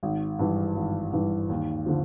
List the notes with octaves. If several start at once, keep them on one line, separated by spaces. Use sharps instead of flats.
G#1
G2 E3
G#1
G2 E3
D#2
D3 F3